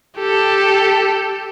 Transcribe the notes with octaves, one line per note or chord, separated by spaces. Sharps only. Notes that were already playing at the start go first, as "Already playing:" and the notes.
G4 A4